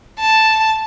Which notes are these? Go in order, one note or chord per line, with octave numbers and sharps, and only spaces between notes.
A5